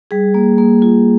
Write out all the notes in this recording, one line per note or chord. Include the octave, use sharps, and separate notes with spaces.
G3 G#4
A#3
A#3
F4